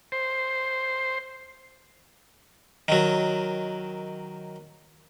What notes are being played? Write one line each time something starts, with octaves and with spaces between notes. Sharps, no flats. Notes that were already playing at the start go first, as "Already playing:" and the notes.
C5
D#3 F#3